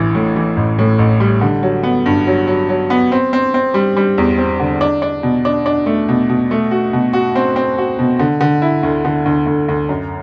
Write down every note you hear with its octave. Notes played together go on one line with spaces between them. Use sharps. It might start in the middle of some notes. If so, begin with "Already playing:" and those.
Already playing: A1 E3
A2
E3
A1
A2
A1
G3
D3
F#3
B3
G2
F#3
F#3
F#3
B3
C4
C4
C4
G3
G3
E2
C4
D3
D4
D4
B2
D4
D4
A3
B2
B2
A3
F#4
B2
F#4
C4
C4
F#4
B2
D3
D3
E4
D2
D3
D2
D2
D2
F#2